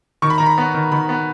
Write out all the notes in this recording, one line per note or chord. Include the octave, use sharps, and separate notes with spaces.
D#3 C#6
B5
D#3 A#5
B5
B3
D#3
D#3 B5
B3